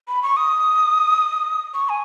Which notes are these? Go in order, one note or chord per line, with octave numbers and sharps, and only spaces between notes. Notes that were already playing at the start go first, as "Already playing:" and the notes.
B5
C#6
D#6
C#6
G#5